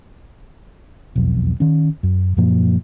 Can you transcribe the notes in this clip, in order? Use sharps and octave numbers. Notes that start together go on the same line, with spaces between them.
E1 B1 F2
D#3 C#4
F#2
F#2 A#2 F3 A#3